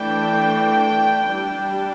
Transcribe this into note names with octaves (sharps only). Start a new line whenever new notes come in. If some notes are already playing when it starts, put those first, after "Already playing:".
Already playing: E3 A3 D4 G5
G3 D4